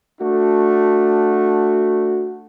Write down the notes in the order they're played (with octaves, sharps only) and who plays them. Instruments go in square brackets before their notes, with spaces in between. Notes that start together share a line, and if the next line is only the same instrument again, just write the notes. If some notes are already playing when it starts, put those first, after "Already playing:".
[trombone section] A3 D4 F#4